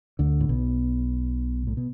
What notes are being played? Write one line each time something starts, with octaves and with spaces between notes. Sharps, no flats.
D2 D3
A2
B1 B2
A2
B2